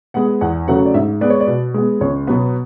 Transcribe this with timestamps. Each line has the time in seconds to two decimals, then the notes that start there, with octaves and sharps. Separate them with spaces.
0.14 G#3 B3 F#5
0.41 E2 F#5
0.68 C#3 F#3 A3 F#5
0.86 D5
0.94 G#2 E5
1.21 G#3 B3 D5
1.30 C#5
1.40 D5
1.47 B2
1.74 G#3 B3
2.00 C#2 C#5
2.27 B2 F#3 B3 B4